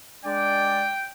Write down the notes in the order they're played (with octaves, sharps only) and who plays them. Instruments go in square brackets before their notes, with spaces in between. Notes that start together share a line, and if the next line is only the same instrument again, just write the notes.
[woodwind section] G#3 D4 D5 [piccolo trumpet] G5